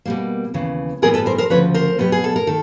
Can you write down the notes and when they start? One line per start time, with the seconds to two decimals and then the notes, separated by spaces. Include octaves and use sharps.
0.05 B2 G3 A#3
0.54 D#2 C#3 E3
1.02 A2 E3 G3 B3 G#4 A#4
1.14 A4 B4
1.26 A#4 C5
1.38 A#4 C5
1.50 D2 C#3 F3 B4 C#5
1.74 A#4 C5
1.99 B2 F#3 B3 G4
2.12 G#4
2.24 A4
2.36 A#4
2.47 D#3 A4